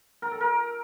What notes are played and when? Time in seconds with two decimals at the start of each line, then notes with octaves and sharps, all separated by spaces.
0.22 A#4
0.31 A4
0.41 A#4